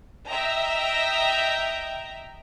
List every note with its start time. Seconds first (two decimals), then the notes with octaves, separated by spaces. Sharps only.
0.29 D#5 E5 G5 A#5